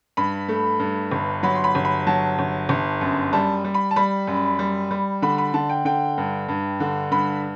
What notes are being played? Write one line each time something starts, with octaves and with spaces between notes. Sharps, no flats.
G2 B5
A3
G2
G1
F#3 B5
C6
B5
G1
B5
F#3 A5
G1
G1
F#2
G3 A5
G3
B5
A5
G3 B5
F#2
G3
G3
D3 B5
B5
D3 A5
G5
D3 G5
G2
G2
D3
G2 B5